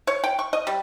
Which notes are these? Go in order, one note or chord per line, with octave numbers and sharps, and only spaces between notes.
C#5
G5
C#6
D#5
G3